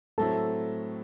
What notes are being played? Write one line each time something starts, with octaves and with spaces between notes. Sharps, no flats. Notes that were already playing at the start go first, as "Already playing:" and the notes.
A2 F#3 A3 C4 E4 A4 A5